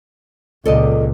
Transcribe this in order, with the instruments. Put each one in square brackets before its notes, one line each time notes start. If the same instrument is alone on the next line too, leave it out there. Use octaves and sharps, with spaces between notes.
[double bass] C#2 A#2 [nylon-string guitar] A4 D5 D#5